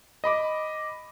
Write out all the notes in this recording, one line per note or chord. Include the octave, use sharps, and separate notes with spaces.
D#5 B5 D6